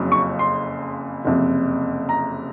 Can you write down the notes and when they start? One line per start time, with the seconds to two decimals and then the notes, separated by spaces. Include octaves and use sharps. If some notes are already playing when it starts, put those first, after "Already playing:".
Already playing: F#1 F2 C#3 F#3
0.12 C#6
0.39 C6
1.25 F#1 F2 C3
2.09 A#5